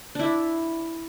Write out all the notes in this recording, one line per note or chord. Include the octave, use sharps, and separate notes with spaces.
D4 E4